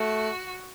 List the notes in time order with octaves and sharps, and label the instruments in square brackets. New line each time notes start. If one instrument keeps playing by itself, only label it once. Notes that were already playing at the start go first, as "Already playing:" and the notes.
Already playing: [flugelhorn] A3 [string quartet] F#4